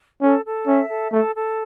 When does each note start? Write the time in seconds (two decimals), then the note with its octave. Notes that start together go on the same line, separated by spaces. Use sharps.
0.22 C#4 A4
0.44 A4
0.67 C#4 E5
0.89 A4
1.12 A3 A4
1.34 A4